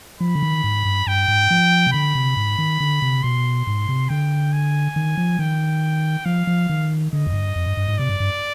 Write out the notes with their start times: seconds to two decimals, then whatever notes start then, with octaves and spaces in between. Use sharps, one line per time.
0.20 F3 B5
0.35 D3
0.43 D#3
0.64 G#2
0.85 G2
1.07 G2 G5
1.28 G#2
1.50 F3
1.87 C3
1.93 D3 B5
2.15 C3
2.37 G#2
2.58 D#3
2.80 D3
3.02 C3
3.23 B2 C6
3.67 G#2
3.89 C3
4.09 D3 G5
4.53 G#5
4.96 D#3
5.17 F3
5.39 D#3 G5
6.25 F3 F5
6.47 F3
6.69 D#3
7.13 D3 D#5
7.27 F2
7.33 G2
7.56 F2
7.66 G2
7.77 G2
7.88 G#2
7.98 C3 D5
8.09 G2
8.20 G2